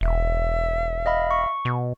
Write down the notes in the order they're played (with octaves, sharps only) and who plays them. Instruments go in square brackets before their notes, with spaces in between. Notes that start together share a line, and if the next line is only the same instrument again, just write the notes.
[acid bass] E1 [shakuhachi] E5
[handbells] D#5 F5 B5
C#6
[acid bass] B2